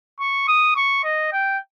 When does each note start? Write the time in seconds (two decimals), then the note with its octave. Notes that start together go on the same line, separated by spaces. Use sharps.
0.20 C#6
0.48 D#6
0.76 C#6
1.04 D#5
1.33 G5